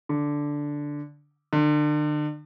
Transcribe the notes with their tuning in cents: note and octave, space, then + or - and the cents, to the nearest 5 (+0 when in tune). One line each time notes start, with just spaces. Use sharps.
D3 -5
D3 +35